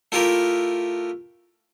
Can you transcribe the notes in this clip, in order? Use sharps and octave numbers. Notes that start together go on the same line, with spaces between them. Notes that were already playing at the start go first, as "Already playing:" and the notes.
A3 E4 F4 G4 A#4